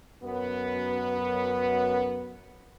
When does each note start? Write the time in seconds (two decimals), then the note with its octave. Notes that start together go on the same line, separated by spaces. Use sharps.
0.23 F#2 B3